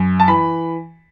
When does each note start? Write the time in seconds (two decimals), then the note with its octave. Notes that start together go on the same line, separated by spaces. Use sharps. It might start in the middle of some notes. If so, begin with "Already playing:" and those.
Already playing: F#2
0.20 A5
0.28 E3 B5